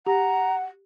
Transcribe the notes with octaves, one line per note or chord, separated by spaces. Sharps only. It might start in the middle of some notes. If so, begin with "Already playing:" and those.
G4 F#5 A#5